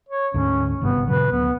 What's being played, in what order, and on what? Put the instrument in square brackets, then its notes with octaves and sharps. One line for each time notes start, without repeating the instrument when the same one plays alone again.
[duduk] C#5
[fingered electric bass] D2 G#2 D3 [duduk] C#4
[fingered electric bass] G#1 G2 C3 [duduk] B3
[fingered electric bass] A#2 C#3 F#3 [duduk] B4
[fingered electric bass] D2 [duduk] B3